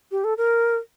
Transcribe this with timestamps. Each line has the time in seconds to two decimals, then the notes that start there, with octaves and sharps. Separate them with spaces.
0.11 G4
0.24 A4
0.37 A#4